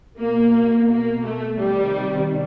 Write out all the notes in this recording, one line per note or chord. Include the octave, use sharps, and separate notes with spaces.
B2 A#3
A#3
A3
C3 D#3 G3